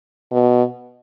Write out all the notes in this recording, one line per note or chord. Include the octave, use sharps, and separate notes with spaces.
B2